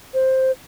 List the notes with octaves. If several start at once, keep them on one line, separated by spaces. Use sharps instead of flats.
C5